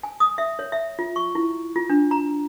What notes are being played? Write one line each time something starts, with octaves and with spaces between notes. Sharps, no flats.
G#5
D#6
E5
C#5
E5
F4
C#6
E4
F4
D4
A#5